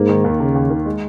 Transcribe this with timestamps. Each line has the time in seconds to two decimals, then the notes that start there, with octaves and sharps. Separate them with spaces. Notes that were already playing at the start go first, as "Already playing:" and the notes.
Already playing: G#2 A#3
0.09 D#3
0.24 D#2
0.39 C#3 A#3
0.55 D#2
0.71 D#3
0.86 G#3